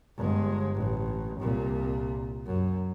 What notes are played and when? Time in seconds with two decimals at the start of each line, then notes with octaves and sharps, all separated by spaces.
0.17 G1 G#3
0.76 A1
1.40 C2 A#2
2.46 F#2